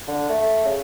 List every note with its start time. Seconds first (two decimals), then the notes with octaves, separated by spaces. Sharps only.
0.08 D3
0.29 A3
0.65 C#3